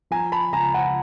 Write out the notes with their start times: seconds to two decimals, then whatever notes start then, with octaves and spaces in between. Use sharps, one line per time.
0.11 F3 G#5 A#5
0.32 A5 B5
0.52 C#2 G#5 A#5
0.74 F#5 G#5